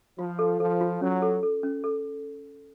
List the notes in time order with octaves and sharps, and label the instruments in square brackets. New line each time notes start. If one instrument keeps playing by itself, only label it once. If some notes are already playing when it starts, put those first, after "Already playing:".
[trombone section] F3 [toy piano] F4
[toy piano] A4
[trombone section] F3 [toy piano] A4
[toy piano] F4
[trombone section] F#3 [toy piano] C#4
[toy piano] A4
A4
C#4
A4